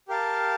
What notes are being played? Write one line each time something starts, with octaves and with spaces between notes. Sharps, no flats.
G4 A#4 F5 A5